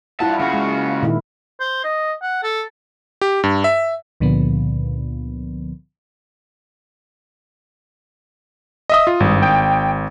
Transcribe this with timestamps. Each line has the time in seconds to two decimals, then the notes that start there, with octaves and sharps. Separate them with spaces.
0.20 G2 E4 F4 F#5 A5
0.40 C#3 F#4 F5
0.54 G#3
1.03 A#2 D#3 E4
1.60 C5
1.84 D#5
2.22 F#5
2.43 A4
3.21 G4
3.44 G2
3.64 E5
4.20 C#2 A#2 D3 F3 B3
8.90 D#5 E5 D#6
9.07 F4
9.20 G#1 G2
9.42 G5